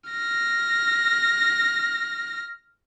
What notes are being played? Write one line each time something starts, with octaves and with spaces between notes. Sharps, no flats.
F6 A#6